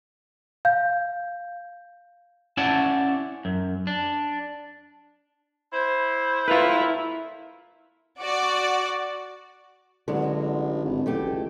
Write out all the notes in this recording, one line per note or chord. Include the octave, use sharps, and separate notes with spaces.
F5 G6
C#4 E4 C#5 D5 F#5 A5
F#2
D4
E4 C5
A2 B3 E4 F4 A#4 B4
F#4 D5
A1 D3 F#3 G#3
G#1
F#1 E3 A3 G4
C#2